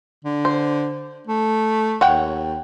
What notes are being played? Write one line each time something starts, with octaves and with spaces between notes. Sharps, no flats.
D3
C5
A3
D#2 C#5 F#5 G5